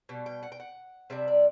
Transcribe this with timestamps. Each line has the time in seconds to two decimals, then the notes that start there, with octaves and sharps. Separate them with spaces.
0.09 B2 G3
0.26 G5
0.43 F#5
0.52 G5
0.60 F#5
1.10 C3 G3 D4 E5
1.28 D5